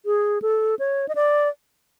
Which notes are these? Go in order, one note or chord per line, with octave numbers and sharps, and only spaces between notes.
G#4
A4
C#5
D#5
D5